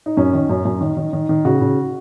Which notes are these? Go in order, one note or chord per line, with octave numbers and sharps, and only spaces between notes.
D#4
F#2 C#4
D#3
F#2
F#2
D#3
D#3
D#3
D#3
C#3 F#4
C#3